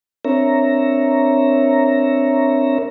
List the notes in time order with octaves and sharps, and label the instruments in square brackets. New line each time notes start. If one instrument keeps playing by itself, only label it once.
[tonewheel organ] C4 D4 A#4 C#5 E5 A#5